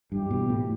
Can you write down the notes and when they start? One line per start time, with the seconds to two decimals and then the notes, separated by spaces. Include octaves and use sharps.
0.12 G2 E3 G3 E4 G4
0.31 B2
0.49 A2